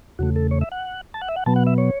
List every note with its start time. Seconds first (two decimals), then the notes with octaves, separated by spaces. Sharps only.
0.19 E2 C#3 A3 F#4
0.36 A4
0.51 C#5
0.61 E5
0.72 F#5
1.14 A5
1.21 F#5
1.28 E5
1.36 F#5
1.46 B2 F#3 B3 A5
1.56 F#5
1.67 E5
1.78 C#5